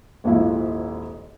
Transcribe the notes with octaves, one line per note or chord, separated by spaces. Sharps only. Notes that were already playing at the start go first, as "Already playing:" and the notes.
D#1 G#1 G#2 F3 E4 E5